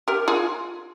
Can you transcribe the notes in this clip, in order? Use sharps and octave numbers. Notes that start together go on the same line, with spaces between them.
G4 A#4
F4 G#4